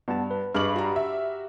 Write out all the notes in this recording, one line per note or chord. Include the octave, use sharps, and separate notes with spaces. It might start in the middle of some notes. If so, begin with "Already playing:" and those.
G2 B3 F#5 A5
B4
G2 G#4 B4 D#5 C#6 D6 F6 F#7
F#4 G4 A#5
E5